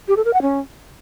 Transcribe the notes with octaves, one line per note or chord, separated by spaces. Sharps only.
G4
A4
A#4
F#5
C#4